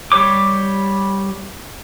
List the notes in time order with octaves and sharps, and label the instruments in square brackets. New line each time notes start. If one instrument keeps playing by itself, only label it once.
[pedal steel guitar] G3 G4 C#5 D6